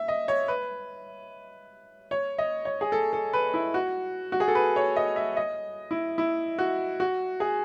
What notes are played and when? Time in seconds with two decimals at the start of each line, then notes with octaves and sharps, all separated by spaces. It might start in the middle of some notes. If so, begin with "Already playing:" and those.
Already playing: E5
0.08 D#5
0.28 C#5
0.48 B4
2.11 C#5
2.38 D#5
2.65 C#5
2.81 G#4
2.92 A4
3.13 A4
3.33 B4
3.54 E4
3.74 F#4
4.32 F#4
4.40 G#4
4.48 A4
4.55 B4
4.76 C#5
4.96 D#5
5.16 E5
5.37 D#5
5.91 E4
6.18 E4
6.59 F#4
7.00 F#4
7.40 G#4